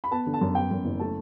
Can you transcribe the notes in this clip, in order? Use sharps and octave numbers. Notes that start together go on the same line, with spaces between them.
B5
B3 A5
D3
A5
F#2
B3 G5
F#2
F#1
A3 A5